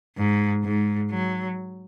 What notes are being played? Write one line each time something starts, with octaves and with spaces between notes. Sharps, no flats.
G#2
G#2
F#3